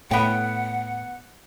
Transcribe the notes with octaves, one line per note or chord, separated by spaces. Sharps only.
A2 B3 F#5 G5